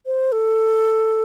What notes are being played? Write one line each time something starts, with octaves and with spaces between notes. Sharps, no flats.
C5
A4